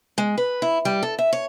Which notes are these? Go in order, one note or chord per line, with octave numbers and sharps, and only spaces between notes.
G#3
B4
E4
G3
A4
E5
C#5